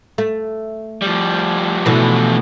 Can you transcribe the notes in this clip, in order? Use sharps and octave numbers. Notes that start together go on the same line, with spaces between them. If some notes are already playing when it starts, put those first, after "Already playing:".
A3
F3 G3
B2 D3 E3 F3 A3